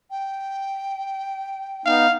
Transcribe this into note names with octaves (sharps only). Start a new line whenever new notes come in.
G5
B3 D#4 F5